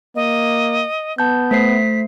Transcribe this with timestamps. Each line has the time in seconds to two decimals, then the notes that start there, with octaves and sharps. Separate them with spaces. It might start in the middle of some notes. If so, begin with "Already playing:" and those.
0.16 A#3 D#5
1.18 B3 A5 G6
1.51 A3 C5 B6 C7